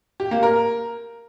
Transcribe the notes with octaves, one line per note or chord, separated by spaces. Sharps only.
G4
A#3
A#4